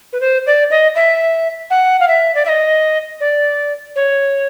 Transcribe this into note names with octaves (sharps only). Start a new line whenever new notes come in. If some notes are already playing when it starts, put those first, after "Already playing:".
B4
C5
D5
D#5
E5
F#5
F5
E5
D5
E5
D#5
D5
C#5